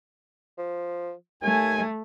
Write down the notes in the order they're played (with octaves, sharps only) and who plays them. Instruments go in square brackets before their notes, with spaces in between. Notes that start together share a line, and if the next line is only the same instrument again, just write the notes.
[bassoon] F3
[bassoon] D#2 [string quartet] A3 [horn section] G#5